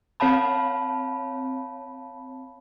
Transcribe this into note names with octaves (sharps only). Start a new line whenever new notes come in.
C4 C#5 F5 A5 B5